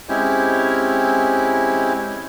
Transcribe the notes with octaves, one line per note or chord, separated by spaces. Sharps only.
G#3 C4 C#4 E4 G4